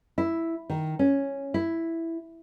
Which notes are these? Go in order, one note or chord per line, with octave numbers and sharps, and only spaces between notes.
E4
D#3
C#4
E4